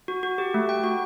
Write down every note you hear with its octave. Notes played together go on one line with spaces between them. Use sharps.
F#4
F#4
G4
A3
G5
F#4